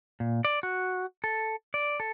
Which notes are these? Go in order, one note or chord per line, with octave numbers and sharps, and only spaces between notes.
A#2
D5
F#4
A4
D5
A4